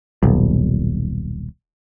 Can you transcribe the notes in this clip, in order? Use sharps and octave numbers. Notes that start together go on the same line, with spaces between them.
D#1 B1